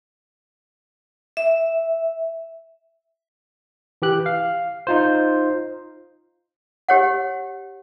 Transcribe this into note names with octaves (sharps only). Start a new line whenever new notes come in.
E5
E3 G4 F#6
F5
D#4 F4 C5
G4 C#5 F#5